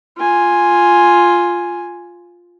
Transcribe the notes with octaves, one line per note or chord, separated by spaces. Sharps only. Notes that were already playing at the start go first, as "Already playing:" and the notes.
F4 G#5